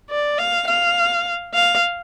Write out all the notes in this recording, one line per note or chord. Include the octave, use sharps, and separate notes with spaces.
D5
F5
F5
F5